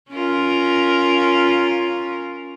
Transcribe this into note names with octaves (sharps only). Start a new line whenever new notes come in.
C#4 F4 A#4